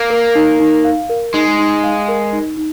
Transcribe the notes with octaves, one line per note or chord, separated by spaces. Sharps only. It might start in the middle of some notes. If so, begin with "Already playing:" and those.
Already playing: A#3
A#4
D#4
D#4
F5
A#4
G#3 D#4
D#4
F5
A#4
D#4
D#4